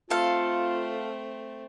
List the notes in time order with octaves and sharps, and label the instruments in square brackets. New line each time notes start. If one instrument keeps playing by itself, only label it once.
[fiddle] A3 C4 [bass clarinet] F4 [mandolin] A4 F5